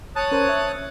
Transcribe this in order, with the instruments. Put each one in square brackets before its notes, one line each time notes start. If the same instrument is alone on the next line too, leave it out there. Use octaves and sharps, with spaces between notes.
[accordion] C#5 D#6 F#6 [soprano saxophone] A5
[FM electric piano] C#4 A#4 C5
E5